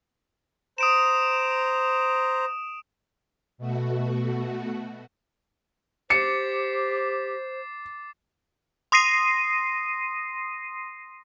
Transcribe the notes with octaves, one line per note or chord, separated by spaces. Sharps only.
C5 A#5 D#6 D7 E7
B2 A3 F#4
G4 C5 D6 A6 C7 C#7
C6 D#6 A#6 C7 D#7